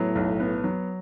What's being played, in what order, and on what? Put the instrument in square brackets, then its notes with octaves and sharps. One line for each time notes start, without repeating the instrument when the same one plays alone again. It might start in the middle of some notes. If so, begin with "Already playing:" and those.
Already playing: [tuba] A2 [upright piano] F#3 B3
[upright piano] B1
B3
F#3